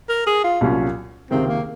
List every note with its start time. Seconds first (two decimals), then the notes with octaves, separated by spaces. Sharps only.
0.09 A#4
0.27 G#4
0.44 F4
0.61 C2 A#2 F#3 C#4 F4
1.31 C#2 C3 D#3 C4
1.47 A#3